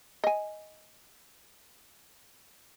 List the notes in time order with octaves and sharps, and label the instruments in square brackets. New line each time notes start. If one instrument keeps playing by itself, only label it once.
[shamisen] D#5 G#5